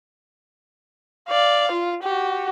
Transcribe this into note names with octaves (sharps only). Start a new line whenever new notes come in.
D5 F5
F4
F#4 G4